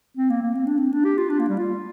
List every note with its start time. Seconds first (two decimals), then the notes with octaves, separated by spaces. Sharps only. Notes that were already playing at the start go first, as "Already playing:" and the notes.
0.17 C4
0.30 A#3
0.43 A#3
0.55 C4
0.67 D4
0.78 C4
0.92 D4
1.05 G4
1.18 F4
1.30 D4
1.39 A#3
1.49 G3
1.58 F4